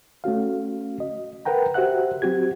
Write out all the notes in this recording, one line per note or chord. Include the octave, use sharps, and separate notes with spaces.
A3 C#4 F#4 F5
D#5
A#4 B4 F#5 G5 A#5
F#4 G4 C5 E5 F#5 F#6
F#3 C4 F#4 G4 G#6